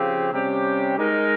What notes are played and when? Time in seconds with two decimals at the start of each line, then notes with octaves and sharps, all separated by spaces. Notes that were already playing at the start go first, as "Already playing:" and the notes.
Already playing: C#3 F3 C4 G4
0.31 C3 G3 C#4 G4
0.97 G#3 D#4 A#4